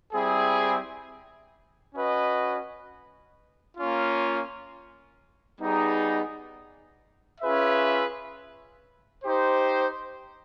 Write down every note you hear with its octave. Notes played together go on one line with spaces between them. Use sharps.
G3 C4 E4 G#4
C#4 F#4 B4 D#5
A#3 C#4 F4
G3 B3 D#4 G#4
C#4 F4 G#4 B4 E5
D#4 G4 C5